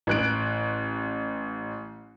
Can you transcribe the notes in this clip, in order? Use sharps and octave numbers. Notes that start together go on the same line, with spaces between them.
A1 F#6 D7